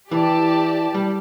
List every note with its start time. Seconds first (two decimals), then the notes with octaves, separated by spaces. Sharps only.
0.10 E3 G4 D5 A5
0.94 G3